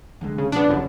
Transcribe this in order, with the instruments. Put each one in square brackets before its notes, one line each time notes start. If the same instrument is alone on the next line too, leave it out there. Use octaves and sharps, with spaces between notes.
[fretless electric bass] C2 D3 G#3
[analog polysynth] C#3
[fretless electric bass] B2 F3 [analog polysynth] B3 D4
[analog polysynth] G1 F#2 [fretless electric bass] C#3 F#3